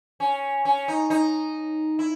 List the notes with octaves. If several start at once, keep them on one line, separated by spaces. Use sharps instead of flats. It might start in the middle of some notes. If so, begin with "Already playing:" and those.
C#4
C#4
D#4
D#4
E4